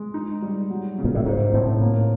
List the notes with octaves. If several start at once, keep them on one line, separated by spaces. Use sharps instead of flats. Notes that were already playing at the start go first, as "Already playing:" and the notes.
Already playing: G#3
D#4
G3
F#3
C#3
A#2
A2
G#2 D#4
A2 C4
A#3